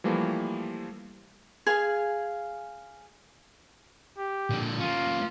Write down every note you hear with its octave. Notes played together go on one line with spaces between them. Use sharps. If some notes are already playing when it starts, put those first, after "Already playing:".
E3 F3 G3 A3 A#3
G#4 F5 G#5
G4
A#2 D3
A#3 C#4 F4